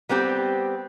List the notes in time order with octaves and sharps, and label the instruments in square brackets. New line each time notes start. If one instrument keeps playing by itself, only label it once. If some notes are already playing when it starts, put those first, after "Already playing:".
[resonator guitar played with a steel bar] G3 B3 C4 G4